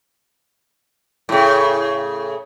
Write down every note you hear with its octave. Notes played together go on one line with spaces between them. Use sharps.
A2 C#3